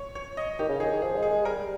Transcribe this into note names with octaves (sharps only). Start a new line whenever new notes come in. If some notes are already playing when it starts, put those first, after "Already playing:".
Already playing: C#5
C#5
D#5
D#3 G4
C#3
D#3 G#4
D#3
F3 G#4
G#3
G#4
G#3
G3 A#4